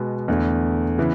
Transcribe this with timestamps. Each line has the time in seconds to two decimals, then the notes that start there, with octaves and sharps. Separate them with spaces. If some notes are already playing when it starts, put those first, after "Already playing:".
Already playing: B2 G#3 B3
0.28 E2 D3 A3
0.98 C#3 E3 B3